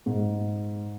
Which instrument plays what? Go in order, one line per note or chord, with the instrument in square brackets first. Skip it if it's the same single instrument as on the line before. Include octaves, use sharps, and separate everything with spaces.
[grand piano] G#2